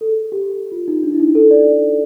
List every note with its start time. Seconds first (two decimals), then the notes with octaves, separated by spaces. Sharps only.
0.01 A4
0.08 G#4
0.32 G4
0.72 F4
0.88 D#4
1.03 D4
1.12 E4
1.20 D#4
1.35 A4
1.51 D5